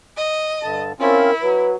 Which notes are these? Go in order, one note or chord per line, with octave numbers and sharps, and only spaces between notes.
D#5
G2 D3 A5
C4 C#4 E4 F4 A#4
F#3 B4